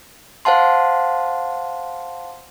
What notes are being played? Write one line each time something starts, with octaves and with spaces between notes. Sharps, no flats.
C5 F5 F#5 A5 C6